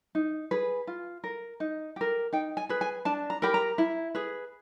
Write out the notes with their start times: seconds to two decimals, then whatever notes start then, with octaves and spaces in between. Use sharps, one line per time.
0.15 D#4
0.51 G#4 B4
0.87 F4
1.24 A#4
1.60 D#4
1.96 G4 A#4
2.33 D#4 G5
2.57 G#5
2.69 G#4 B4
2.81 G#5
3.05 D4 A5
3.30 A#5
3.42 G4 A#4 B5
3.54 A#5
3.78 E4
4.15 G#4 B4